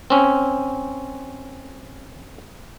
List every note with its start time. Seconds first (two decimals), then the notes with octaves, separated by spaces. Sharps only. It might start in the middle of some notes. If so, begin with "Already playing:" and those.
0.10 C4 C#4